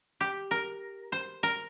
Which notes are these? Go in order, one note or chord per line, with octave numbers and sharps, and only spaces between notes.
G4
A#4
C5
A#4